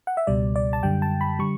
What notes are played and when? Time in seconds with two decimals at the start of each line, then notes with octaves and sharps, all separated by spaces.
0.07 F#5
0.17 E5
0.27 C#2 B2 G3 D5
0.56 D5
0.73 A5
0.83 F#2 D3 G3 G5
1.02 A5
1.21 B5
1.39 D3 G3 C#6